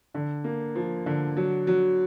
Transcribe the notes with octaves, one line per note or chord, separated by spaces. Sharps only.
D3
A#3
F3
D3
F#3
F#3